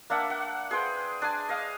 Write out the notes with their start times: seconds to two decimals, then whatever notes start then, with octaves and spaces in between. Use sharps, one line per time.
0.10 A#3 D4 E5 F#5
0.30 F#5
0.71 G#4 B4 C5 G5
1.22 D4 D5 G#5
1.49 D#5 F5